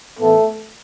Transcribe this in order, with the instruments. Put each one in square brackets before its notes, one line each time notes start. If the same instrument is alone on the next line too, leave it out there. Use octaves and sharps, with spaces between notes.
[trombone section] A2 E3 A3 B3 A4